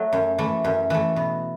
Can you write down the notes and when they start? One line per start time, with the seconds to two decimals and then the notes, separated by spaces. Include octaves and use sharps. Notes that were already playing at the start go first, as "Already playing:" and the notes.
Already playing: F#3 A3
0.13 F#2
0.38 E3 A3
0.64 F#2
0.90 E3 A3
1.16 B2